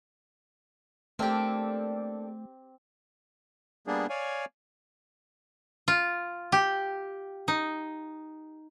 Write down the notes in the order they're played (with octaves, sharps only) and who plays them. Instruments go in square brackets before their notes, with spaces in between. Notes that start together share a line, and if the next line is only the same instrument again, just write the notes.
[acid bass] A3 [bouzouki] A#3 D4 A4 [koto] C4 G4
[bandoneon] G3 A#3 B3 D4 G#4
C#5 D5 F5 G#5
[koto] F4
G4
D#4